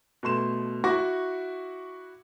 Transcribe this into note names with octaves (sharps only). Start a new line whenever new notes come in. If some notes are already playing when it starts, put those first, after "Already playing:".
B2 A3 C6 E7
E4 F#4 C#6 D6 A#6